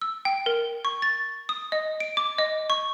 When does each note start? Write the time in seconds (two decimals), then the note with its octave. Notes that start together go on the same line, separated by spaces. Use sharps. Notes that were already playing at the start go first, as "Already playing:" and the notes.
0.02 E6
0.25 G5
0.46 A#4
0.85 C#6
1.02 A6
1.49 D#6
1.72 D#5
2.00 D7
2.17 D6
2.38 D#5
2.70 C#6